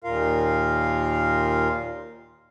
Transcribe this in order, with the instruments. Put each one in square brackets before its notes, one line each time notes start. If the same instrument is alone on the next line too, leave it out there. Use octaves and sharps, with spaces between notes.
[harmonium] D#2 A#2 F4 A#4 F5